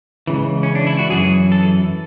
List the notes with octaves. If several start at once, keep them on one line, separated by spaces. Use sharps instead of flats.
C#2 C#3 E3
C#4
D4
E4
F#4
F#2 E3 G#4
A4